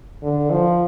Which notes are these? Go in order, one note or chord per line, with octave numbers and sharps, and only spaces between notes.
D3
F3